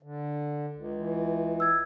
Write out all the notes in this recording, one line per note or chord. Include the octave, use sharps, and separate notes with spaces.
D3
C#2
E3
E6 G#6